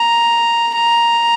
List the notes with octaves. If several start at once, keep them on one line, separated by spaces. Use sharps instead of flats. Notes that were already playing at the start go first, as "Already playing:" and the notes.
Already playing: A#5
A#5